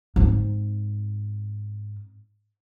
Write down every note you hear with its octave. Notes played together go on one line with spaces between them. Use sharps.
G#2 C4